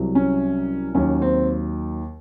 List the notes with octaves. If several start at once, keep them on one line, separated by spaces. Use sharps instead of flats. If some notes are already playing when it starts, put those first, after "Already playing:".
Already playing: C2 C3 F#3
C#4
D#2 D#3 F#3 C#4
C4